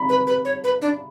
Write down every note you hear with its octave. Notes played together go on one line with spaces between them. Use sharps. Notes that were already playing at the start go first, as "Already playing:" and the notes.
Already playing: B5
B4
B4
C#5
B4
D4